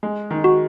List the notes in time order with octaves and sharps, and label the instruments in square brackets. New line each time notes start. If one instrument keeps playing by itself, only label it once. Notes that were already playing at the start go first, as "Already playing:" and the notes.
[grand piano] G#3
D#3
[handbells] F#4